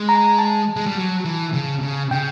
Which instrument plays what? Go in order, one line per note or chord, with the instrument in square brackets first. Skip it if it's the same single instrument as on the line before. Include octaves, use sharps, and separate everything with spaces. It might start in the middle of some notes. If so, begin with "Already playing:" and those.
Already playing: [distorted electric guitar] G#3
[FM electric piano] A#5
A5
[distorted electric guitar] G#3
G3
F#3
E3
C#3
C#3
[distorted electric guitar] C#3 [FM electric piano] G5